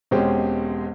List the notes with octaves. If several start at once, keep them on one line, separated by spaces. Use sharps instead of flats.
E1 B2 G#3 C4 C#4 G4